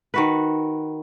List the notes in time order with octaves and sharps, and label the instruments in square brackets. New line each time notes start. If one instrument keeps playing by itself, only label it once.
[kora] D#3 F#4 B4